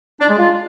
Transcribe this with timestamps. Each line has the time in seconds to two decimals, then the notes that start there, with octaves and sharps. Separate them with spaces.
0.20 D4
0.29 G#3
0.38 F4